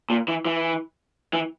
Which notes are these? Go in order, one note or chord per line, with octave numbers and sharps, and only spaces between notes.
A#2
E3
E3
E3